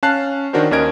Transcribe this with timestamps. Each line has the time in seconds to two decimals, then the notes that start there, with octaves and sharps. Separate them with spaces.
0.03 C#4 F5 A5 F#6 C7
0.53 D#3 C#4 D4 F#4 A#4 C5
0.71 D#2 C#4 A#4 D#5 G#6 D7